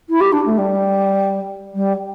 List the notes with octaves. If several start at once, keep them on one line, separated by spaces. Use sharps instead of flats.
E4
G4
D4
A3
G3
G3